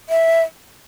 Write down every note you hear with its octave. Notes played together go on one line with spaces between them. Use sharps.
E5